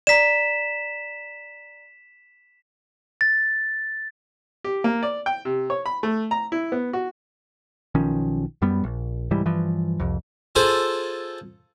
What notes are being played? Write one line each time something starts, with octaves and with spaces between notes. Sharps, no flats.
D5 A#5 B6 E7
A6
G4
A#3
D5
G5
C3
C#5
B5
A3
A#5
E4
B3
F#4
B1 D#3 F3 C#4
F#2 G3 B3
A#1
C2 G#2 E3 G3
G2 E3 F3
C2 F2
F4 G#4 A4 C5